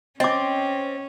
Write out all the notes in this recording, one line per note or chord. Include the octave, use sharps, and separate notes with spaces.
C4 C#4 D#5 D6